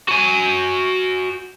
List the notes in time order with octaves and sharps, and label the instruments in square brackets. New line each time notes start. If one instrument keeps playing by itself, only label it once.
[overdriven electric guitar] F#4 G#5